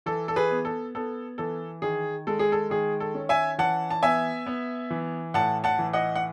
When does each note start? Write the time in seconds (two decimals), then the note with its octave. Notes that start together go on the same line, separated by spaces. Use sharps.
0.06 E3 A4
0.28 A4
0.36 G#4 B4
0.51 B3
0.65 A4
0.95 B3 A4
1.38 E3 A4
1.82 D#3 G#4
2.27 G#3 A4
2.39 G#4
2.52 A4
2.70 D#3 G#4
3.00 A4
3.14 C#4
3.29 E5 G#5
3.58 E3 F#5 A5
3.90 A5
4.03 B3 E5 G#5
4.46 B3
4.90 E3
5.34 A2 F#5 A5
5.64 F#5 A5
5.79 E3
5.93 D#5 F#5
6.16 F#5